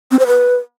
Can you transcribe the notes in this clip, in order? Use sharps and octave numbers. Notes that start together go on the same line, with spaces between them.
C4
C5
B4